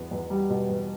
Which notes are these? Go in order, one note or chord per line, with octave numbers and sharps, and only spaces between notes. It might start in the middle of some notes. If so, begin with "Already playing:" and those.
Already playing: E2 B2 B3
E2
G3
B2
E2